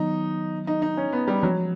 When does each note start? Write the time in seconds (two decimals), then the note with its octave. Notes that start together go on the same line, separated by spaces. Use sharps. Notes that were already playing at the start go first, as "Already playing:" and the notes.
Already playing: D#3 F#3 B3 D#4
0.67 D#4
0.82 D#4
0.97 C#4
1.13 B3
1.28 G3
1.43 F3 F#3 G#3 C#4